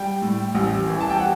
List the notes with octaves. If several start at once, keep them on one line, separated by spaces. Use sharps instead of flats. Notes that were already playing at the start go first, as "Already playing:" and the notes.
Already playing: G3 G5
A2
A1
E3
A5
G5
F#5